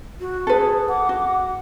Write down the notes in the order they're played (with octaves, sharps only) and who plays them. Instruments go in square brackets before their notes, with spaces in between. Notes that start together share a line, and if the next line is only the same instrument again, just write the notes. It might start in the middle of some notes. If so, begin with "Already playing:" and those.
[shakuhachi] F#4
[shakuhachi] G#4 [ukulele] A4 B4
[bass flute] F#5 [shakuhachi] D6
[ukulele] F#4